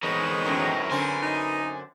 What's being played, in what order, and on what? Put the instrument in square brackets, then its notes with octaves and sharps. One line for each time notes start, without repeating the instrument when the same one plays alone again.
[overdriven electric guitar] E2 [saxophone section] G#3 C4 D#4 [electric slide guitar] A#4 B4 C#5
[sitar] F#2 A2 F#3
[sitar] F#2 D3 C4 [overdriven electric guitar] G#5
[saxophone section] D#4